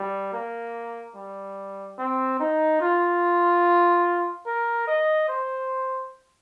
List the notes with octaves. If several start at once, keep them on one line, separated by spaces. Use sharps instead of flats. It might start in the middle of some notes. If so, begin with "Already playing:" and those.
Already playing: G3
A#3
G3
C4
D#4
F4
A#4
D#5
C5